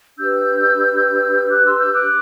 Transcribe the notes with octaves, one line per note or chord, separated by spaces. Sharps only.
D4 G4 B4 E6 G6
D6 F#6
C6 E6
E6 G6
D6 F#6